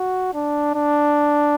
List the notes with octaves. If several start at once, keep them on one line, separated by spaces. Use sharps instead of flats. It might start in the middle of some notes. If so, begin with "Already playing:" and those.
Already playing: F#4
D4
D4